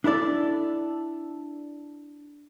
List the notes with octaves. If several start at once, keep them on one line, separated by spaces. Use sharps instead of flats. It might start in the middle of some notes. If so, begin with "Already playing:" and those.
D4 E4 A4 D5